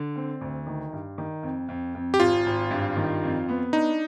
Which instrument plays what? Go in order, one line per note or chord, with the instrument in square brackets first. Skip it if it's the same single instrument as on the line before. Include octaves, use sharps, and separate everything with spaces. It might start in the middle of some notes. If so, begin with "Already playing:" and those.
Already playing: [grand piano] D3
C4
D2
D#3
G2
D#3
F2
F2
F2
[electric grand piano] G4
[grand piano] G#1 [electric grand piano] F4
[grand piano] G#1
G2
D#3
F2
B3
[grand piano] D4 [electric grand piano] D#4